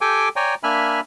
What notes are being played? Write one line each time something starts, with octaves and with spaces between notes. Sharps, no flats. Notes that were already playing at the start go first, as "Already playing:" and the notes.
G4 A4 G5 G#5 D6
C#5 D5 G5 G#5 A#5
A#3 D4 E5 G#5 B5 F6